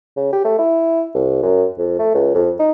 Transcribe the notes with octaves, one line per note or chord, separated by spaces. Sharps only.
C#3
G4
A3
E4
C2
F#2
F2
A3
C#2
F2
D#4